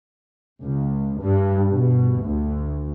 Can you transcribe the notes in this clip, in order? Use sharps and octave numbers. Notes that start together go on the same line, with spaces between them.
C#2
G2
B2
D2